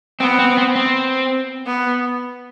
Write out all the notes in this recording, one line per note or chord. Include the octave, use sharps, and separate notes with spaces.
B3 C4
C4
C4
C4
B3